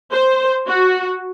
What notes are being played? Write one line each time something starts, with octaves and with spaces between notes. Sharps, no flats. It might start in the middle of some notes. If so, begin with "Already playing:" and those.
C5
F#4